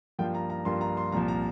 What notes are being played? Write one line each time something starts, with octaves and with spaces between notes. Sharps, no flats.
G2 F3 A#3 F4 G5
A#5
A#5
G2 F3 A#3 F4 C6
A#5
C6
C2 A#2 F3 A#5
A#5